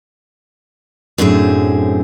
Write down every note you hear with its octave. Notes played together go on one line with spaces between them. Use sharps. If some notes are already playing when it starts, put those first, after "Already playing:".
F#2 A2 D3 C4 G#4